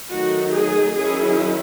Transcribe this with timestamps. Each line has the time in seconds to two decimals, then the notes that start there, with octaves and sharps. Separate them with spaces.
0.11 D#3 F#3 A3 D#4 F#4
0.54 G#4
0.97 D#3 F#3 C#4 E4 G#4